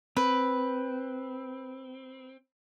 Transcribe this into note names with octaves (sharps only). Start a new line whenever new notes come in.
C4 B4